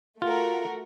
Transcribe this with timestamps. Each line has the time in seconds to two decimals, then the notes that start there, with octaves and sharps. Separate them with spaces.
0.22 A3 F4 F#4 A#4